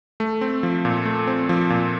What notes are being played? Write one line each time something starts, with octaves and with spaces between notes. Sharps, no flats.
A3
C4
F3
A#2
A3
C4
F3
A#2